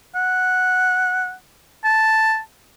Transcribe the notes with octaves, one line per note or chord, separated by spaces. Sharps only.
F#5
A5